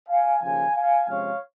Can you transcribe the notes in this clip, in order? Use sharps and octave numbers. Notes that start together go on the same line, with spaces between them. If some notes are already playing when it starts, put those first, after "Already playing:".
F5 G#5
D#2 C#3 F3 F5 G#5
F5 G#5
C3 F3 G#3 C#4 F4 C#5 F5